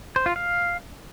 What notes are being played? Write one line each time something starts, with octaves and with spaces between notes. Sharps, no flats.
C5
F4
F5